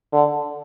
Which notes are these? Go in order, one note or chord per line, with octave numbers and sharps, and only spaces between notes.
D3